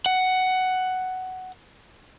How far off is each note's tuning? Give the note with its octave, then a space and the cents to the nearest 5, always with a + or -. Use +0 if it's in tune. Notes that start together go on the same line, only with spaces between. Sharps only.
F#5 +10